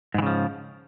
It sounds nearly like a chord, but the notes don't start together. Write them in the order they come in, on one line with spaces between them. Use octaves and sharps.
G#2 E3 C#3 F3